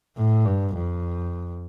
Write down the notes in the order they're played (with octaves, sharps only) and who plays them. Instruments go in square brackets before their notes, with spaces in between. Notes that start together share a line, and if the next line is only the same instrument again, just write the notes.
[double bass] A2
G2
F2